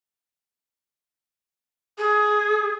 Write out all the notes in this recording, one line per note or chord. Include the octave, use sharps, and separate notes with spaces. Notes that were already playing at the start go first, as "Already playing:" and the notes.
G#4